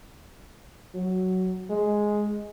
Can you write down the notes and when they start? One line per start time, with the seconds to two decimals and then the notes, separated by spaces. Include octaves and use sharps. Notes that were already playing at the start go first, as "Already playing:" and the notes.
0.94 F#3
1.70 G#3